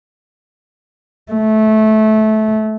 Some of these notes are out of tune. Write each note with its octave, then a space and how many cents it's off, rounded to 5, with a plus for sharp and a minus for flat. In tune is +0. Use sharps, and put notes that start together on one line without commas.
A3 -20